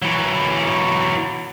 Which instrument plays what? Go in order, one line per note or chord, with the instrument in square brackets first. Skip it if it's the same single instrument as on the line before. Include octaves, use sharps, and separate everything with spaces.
[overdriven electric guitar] E3 F#3